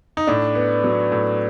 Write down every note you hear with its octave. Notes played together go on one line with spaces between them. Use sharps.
D#4
A2 D4
B3
F#3
A2